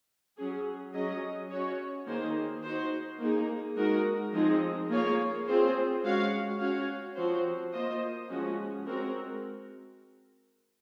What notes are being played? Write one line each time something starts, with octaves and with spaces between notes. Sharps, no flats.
F#3 C#4 G#4
F#3 C#4 G#4 D#5
C#4 F#4 C#5
D#3 A#3 D#4 G#4 C5
D#4 F#4 C5
A#3 D#4 G#4
G#3 D#4 F#4 A#4
F3 G#3 C4 D#4 G#4
A#3 F4 G#4 C#5 F5
C4 F4 G#4 C5
G#3 C#4 F#4 C#5 F5
C#4 F#4 C#5 F5
F3 C4 F#4 C5
A#3 F4 C5 D#5
F3 G#3 C#4 F#4
G#3 C4 F#4 A#4